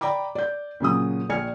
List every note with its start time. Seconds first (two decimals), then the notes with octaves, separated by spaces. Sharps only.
0.01 D5 G5 A#5 B5 D6
0.35 D5 G6
0.80 A#2 C#3 F#3 D#6
1.30 A#1 D5 G#5 F6 G#6 C#7